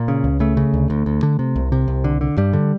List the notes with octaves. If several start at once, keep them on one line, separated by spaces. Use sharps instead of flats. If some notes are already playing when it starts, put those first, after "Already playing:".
Already playing: A#2 A#3
C#3
C#2
C#3 A3
C#3
D2
D2
D2
D3
C3
C2
C3
C2
D3
D3
G2 G3
D3